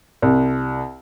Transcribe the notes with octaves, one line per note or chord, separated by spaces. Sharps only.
C2